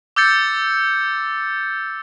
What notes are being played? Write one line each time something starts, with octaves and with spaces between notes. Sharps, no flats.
D6 E6 G6 A6 C#7